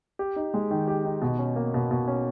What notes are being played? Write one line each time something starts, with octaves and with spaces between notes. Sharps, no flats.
G4
D#4
G#3
D#3
G4
D#4
B2
C#4
A#3
B2
B2
C#4